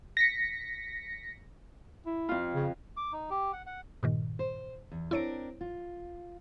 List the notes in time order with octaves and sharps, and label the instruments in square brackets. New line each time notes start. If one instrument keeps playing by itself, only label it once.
[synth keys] A#6 B6 C#7
[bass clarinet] E4
[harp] F2 F4
[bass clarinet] C#3
[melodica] D6
D#4
G4
F#5
F#5
[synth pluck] G2 A#2 D#3
[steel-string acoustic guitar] C5
E2
[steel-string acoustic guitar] C4 D4 A#4 [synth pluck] E4 C#5 D7
[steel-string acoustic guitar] F4